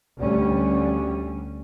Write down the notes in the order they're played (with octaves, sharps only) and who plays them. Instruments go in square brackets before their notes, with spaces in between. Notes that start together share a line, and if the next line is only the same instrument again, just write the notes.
[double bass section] D2 D3 G3 C#4